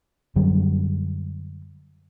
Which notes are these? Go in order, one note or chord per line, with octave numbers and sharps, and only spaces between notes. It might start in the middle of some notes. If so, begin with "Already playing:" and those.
F#2 D3 F#3 G3